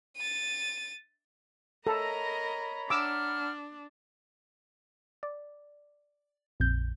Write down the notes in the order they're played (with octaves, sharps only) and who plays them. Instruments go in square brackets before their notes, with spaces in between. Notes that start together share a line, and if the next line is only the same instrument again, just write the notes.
[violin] A6 D#7
[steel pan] A4 [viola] A#4 D#5 [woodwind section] C#5 A#5 B5
[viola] D4 [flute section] F#5 F6 [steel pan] D6 E6
[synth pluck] D5
A#1 F2 G6